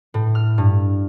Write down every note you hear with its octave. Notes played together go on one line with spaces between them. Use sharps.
A2
F6
G2